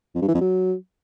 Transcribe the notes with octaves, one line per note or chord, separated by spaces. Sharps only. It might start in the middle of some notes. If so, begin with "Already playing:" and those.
F2
G2
E3
F2
F#3